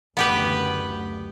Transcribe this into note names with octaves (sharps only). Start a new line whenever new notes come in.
F#1 D2 B3 G4 B4